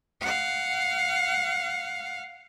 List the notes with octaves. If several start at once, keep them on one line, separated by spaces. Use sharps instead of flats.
F5 F#5